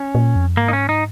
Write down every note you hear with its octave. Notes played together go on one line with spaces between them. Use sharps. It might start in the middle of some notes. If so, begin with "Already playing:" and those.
Already playing: C#4
A#2
F2
G#2 A#3
D#4
C#4
D#4